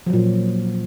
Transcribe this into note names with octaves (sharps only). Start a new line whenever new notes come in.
A#2 F3 F#3